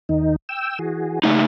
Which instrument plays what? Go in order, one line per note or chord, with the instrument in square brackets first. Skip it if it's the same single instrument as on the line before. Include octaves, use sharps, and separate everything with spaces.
[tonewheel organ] D#2 D#3 D#4
G5 E6
E3 F#4 G#4
[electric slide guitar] C#3 A3 D#4